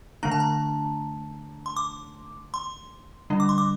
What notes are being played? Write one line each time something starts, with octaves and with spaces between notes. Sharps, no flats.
D3 A3 D4 A#5
A5
A#5
C6
D6
C6
D3 G3 D4
D6
C6
D6